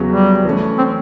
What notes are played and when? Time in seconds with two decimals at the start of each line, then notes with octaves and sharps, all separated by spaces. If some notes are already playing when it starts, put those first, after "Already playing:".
Already playing: E2 C#3 F#3
0.12 G3
0.45 E3 A3 C#4
0.78 C4